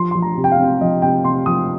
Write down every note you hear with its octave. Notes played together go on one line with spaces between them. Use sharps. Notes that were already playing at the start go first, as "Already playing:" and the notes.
Already playing: F3 C6
F3 C6
A#5
C3
G5
F5
C4
F3 D#5
C3 G5
C3 C6
F3 D#6